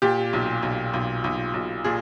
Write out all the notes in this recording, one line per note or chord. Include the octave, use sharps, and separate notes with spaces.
A#2 G4
B1
B1
B1
B1
B1
A#2 G#4